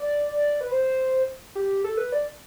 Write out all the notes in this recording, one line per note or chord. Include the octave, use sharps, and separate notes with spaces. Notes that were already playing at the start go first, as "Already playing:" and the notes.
Already playing: D5
B4
C5
G4
A4
B4
D5